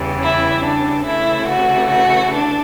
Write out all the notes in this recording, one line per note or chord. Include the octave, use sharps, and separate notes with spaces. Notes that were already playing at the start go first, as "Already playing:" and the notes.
Already playing: E2 C#3 E3 G3
E4
D4
C#3 E3 A3 E4
F#4
F#4
D4